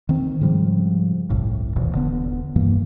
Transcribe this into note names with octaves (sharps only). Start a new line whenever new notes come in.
D#3 C4
G#2 C#3 F3 G3
G1 C2 A2
G#1 D#2 B2 E3
D#1 D3 B3
G2 E3 A#3